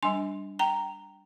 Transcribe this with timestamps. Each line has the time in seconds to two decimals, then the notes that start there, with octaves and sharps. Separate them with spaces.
0.03 G3 D4 G#5 C6
0.59 G5 A#5